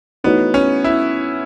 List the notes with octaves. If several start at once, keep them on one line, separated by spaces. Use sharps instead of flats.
E3 A3 B3 D#4 F#4 C#5
C#4
E4